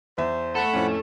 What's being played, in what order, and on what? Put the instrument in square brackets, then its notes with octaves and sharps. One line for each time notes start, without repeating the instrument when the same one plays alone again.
[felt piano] E2 E5 [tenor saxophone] C5
[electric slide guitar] A3 A4 [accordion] F#5 B5
[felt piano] F2 A2 C#4 [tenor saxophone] F3